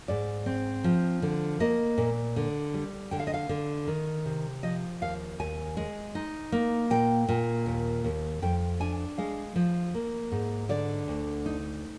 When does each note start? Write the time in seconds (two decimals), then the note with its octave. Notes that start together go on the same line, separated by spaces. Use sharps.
0.08 G#2 D5
0.46 C4
0.84 F3
1.22 D3
1.60 A#3 D#5
1.98 A#2
2.36 D3
2.74 G3
3.11 D3 G5
3.20 F5
3.27 D#5
3.34 F5
3.49 D3
3.87 D#3
4.25 C3
4.63 F3 D#5
5.01 D#2 F5
5.40 D#2 G#5
5.77 G#3
6.15 D#4
6.52 A#3
6.90 A#2 G5
7.29 A#2
7.66 D#2
8.04 D#2
8.42 F2 G5
8.80 D4 G#5
9.18 G#3 F5
9.55 F3
9.94 A#3
10.31 G#2
10.69 D3 D5
11.08 D2
11.46 D#4